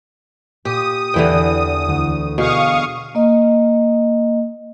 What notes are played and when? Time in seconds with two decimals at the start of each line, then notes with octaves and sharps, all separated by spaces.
0.65 A#2 G4 D#6
1.14 E2 D3 E3 B4 G5
1.88 D2
2.38 B2 G#4 F5 C#6 D#6 C#7 E7
3.15 A#3 D#5